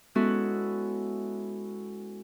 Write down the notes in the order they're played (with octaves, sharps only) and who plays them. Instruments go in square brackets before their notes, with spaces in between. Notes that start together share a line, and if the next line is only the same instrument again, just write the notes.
[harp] G#3 B3 C#4 E4 F#4 A4